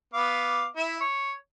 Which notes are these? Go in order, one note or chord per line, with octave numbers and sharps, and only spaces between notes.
B3 F5 D6
E4 E5
C#5